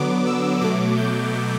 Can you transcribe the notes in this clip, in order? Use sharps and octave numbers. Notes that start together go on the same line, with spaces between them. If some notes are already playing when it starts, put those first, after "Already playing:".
Already playing: D3 F#3 B3 D6
E6
B2 F#3 A3 D6
G6